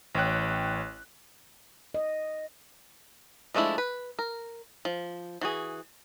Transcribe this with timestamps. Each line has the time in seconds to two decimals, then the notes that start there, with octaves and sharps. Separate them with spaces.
0.15 A1 C#5 G5 F#6
1.94 D#5
3.54 F3 G#3 A3 D4 E4
3.78 B4
4.19 A#4
4.85 F3
5.41 E3 F#4 G#4